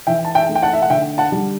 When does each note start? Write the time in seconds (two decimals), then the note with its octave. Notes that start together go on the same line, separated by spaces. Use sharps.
0.07 E3 E5 G5
0.25 A5
0.35 E5 G5
0.49 A3
0.55 G5
0.62 F#5 A5
0.73 E5
0.82 F#5
0.90 D3 E5 G5
1.18 F#5 A5
1.32 G3